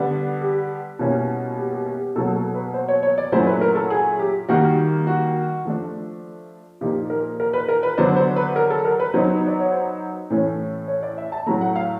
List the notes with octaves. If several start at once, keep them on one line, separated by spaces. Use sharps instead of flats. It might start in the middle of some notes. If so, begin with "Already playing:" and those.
Already playing: D3 G3 B3 D4
G4
B2 G3 A#3 C#4 E4
G4
G4
G4
G4
B2 F#3 A#3 A4
A4
B4
C5
C#5
C#5
D5
A#2 F#3 A3 C#4 E4 C5
B4
A#4
A4
G#4
G4
D#3 G3 A#3 F#4
F#4
F3 A3 D4
A#2 F3 A#3 D#4 G4
A#4
A#4
B4
A#4
B4
D3 F#3 B3 D4 C5
C5
B4
A#4
A4
A#4
B4
F#3 B3 D#4 C5
D5
C#5
C5
A2 E3 A3 C#4
C#5
D5
E5
A5
A2 F#3 A3 A#5
F#5
F5